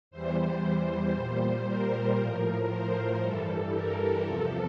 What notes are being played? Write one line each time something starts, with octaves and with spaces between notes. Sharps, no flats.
E2 E3 G3 C5
A#2 G3
A#4
A2 F3
C5
G2 E3 G3 A4
A#4
E2 C3 F3 A4